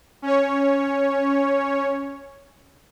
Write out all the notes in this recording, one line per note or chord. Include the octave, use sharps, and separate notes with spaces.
C#4 C#5